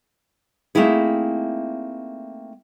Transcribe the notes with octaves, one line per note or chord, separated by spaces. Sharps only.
A3 A#3 C4 D#4 E4 G#4